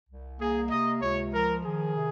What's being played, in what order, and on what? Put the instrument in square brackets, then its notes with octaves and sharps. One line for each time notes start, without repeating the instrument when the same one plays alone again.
[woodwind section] C2
[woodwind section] A#3 [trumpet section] G#4
[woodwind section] C3 [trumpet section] D#5
[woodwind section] C#2 [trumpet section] C#5
[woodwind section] F3 [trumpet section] A#4
[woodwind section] D#3 [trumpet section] G#4
[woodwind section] C3